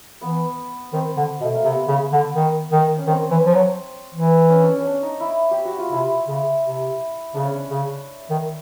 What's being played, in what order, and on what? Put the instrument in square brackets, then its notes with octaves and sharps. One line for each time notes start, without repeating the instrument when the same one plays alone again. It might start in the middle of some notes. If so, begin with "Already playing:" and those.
[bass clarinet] E3 [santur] B3
[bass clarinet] D#3 [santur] C4
[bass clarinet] D3
B2
[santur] A3
A#3
[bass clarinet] C3 [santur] B3
[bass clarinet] C#3
D3
D#3
D#3
[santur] C#4
[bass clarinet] D#3 [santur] C4
[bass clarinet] E3
F3
F#3
E3
[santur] C#4
D4
C#4
C#4 D4
D#4
E4
G4
F#4
F4
[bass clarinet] C3 [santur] E4
[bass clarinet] C#3
C3
[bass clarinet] C#3 [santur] D4
[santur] C#4
D4
[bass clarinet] C#3
D#3